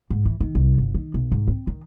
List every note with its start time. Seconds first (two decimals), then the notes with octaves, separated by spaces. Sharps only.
0.10 G#2
0.25 E3
0.40 D#3
0.55 C2
0.78 G1
0.94 D#3
1.14 B1
1.32 G#2
1.47 C4
1.67 D#3